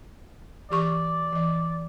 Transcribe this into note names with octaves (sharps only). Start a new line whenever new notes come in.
E3 G4 D5 C#6
E3 D#5